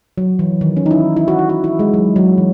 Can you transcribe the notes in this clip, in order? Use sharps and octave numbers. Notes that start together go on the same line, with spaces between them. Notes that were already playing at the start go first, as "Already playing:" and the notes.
F#3
E3
D#3
C#4
D#4
E4
E4
F#4
E4
F#4
E4
G#3
F#3
F#3
E3